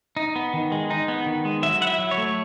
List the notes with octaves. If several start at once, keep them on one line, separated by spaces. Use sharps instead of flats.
D#4
B3
D#3
G#3
D#4
B3
D#3
G#3
F#3 E5
E4 F#5
E5
F#3
C#5
A3